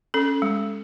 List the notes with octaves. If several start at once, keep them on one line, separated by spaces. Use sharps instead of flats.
C#4 A4
G#3